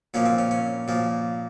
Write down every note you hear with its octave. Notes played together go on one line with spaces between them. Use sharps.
A#2 F3 A#3 C#4
C4
C#4
C#4
A#2 F3 A#3